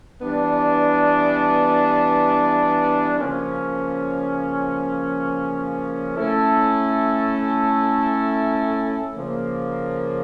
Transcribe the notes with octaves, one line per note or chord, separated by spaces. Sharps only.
E3 G3 B3 D4
C#3 F3 A#3 C#4
A3 C#4 E4 A4
C#3 F3 A#3